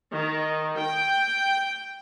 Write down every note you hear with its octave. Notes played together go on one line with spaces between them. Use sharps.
D#3
G5